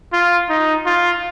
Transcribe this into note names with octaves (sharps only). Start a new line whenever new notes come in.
F4
D#4
F4